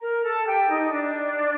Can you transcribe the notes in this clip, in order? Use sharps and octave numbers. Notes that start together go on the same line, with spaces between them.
A#4 A#5
A4 A5
G4 G5
D#4 D#5
D4 D5